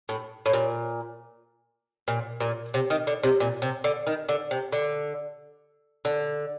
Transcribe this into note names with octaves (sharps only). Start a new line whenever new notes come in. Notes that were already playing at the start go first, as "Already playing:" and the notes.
A2
A2
A#2
A#2
A#2
C3
D#3
D3
C3
A#2
C3
D3
D#3
D3
C3
D3
D3